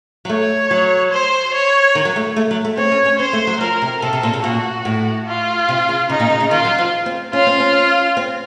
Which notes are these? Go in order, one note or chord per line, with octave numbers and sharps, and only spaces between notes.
F#3
A3 C#5
F#3
C5
C#5
D#3
F#3
A3
A3
F#3
A3
C4 C#5
C#4
C#4
C4 C5
A3
F#3
F3 A#4
C3
C3 A4
C3
A#2
C#3
A#2 F#4
A2
F4
C3
C#3
C#3 D#4
A#2
C#3
C#3
D#3 F4
F#3
F3
C4
C#4 F4
C4
C#4
C4